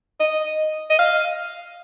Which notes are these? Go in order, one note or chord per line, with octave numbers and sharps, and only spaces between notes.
D#5
D#5
F5